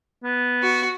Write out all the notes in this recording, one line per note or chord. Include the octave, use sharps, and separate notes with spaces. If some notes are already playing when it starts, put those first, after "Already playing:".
B3
F#4